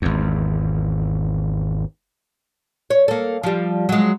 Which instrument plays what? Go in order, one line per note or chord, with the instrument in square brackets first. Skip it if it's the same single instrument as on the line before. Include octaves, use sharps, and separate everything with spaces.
[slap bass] G#1 E2
[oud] C#5
A#3 A4
F3 G3
F#3 G#3